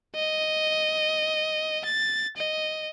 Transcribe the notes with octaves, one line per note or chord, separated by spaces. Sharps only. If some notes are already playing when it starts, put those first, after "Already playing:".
D#5
A6
D#5